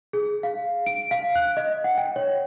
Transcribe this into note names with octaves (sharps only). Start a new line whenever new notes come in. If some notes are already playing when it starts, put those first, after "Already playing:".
G#4
F5
D7
F5
F#6
D#5
F#5
G5
C#5